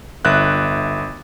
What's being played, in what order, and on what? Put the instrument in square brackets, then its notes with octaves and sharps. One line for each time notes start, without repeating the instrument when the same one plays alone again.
[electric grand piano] G1 E5 F#6